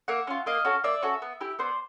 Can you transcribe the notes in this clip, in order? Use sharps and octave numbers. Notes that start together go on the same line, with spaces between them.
A#3 E5 F#5
C#4 F4
A#3 D#5 F5
C#4 F#4 A4
A#3 D5 E5
C#4 F#4 A4
B3
E4 G4
B3 C5 D5